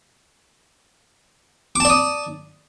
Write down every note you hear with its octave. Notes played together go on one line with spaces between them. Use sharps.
D5 A5 D6 D#6